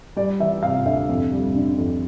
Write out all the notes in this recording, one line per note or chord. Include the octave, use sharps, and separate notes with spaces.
G3 D5
E3 E5
C3 F5
D2 E5
F2
G3
D3
F2